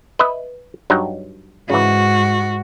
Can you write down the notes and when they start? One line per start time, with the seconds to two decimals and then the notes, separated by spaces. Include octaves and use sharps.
0.19 B4 D#5 E5
0.90 G2 F#3 D#4
1.70 G#2 C#3 E3 F#4